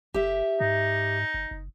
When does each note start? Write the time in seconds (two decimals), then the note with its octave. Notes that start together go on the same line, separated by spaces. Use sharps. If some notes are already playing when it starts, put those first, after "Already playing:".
0.14 F#1 G4 E5
0.60 G#2 D#4
1.34 F#1
1.51 F#1